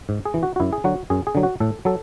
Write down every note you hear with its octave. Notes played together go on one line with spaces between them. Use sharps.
G#2
G#4
E3
F#4
F#4
F#2 E4
G#4
D3 F#3 F#4
F#2 G#4
G#4
D3 F#3
F#4
A2 A4
F#3 A4